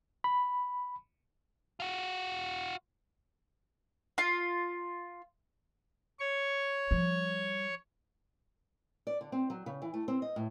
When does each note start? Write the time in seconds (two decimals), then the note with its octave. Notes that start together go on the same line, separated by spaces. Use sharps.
0.24 B5
1.80 F4 F#4
4.18 F4
6.20 C#5 C#6
6.91 F3 G3
9.07 D5
9.21 D3
9.32 C4
9.50 F#3
9.66 C#3
9.82 E3
9.94 A3
10.08 C4
10.22 D#5
10.36 A2